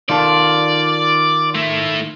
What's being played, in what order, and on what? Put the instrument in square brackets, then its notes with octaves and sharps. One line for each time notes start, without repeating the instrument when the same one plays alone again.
[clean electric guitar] D#3 A4 [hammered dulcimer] F4 F5 [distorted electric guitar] D5
[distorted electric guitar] A3 E4